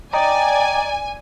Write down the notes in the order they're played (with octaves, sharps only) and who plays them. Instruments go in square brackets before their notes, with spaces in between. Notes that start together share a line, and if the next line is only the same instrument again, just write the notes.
[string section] D5 [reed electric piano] D#5 A#5 [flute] G5 [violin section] G#5